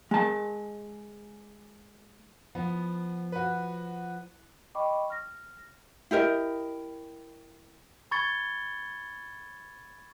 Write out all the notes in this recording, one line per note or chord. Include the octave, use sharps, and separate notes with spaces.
G#3 A5
F3 B3
F#4 B4
D#5 G5 B5 C#6 D6
F6 A#6
E4 G4 A#4 D#5
B5 C#6 G#6 A6 C#7 G7